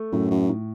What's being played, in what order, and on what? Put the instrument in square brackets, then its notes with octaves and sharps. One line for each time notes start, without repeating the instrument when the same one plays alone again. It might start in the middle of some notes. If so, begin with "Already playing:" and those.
Already playing: [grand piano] A3
[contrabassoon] F#2 [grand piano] A2
[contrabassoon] F#2
[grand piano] A2